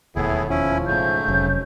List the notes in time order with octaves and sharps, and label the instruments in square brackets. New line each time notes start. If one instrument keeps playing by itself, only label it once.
[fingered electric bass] E1 D#2 [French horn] A2 [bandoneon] B3 E4 G#4
[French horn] F3 [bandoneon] C#4 E4
[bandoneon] G#2 C#3 A3 [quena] G6
[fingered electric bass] F1 F#3 [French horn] C#4